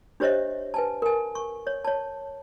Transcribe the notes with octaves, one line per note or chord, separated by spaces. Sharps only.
D4 G4 C5 C#5 D#5 E5
B4 G#5 A5
A#4 G#5
C#6
C#5
C#5 A5